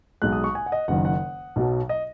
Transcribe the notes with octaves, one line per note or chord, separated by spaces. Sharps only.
B1 B2 G#3 F#6
D#6
C#6
G#5
F#5
D#5
F#1 F#2 D#3 F#5
F#5
B1 B2 F#3
D#5